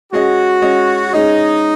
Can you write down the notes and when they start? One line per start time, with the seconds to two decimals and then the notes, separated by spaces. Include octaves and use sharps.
0.12 G#3 C#4 F#4 G#4 D#5
0.62 G#3 C#4 G#4 D#5
1.13 G#3 C#4 D#4 G#4 D#5